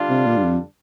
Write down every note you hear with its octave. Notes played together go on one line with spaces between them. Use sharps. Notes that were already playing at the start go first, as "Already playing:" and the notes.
Already playing: D3 G3 D4 F4
C3
A#2
G2
F2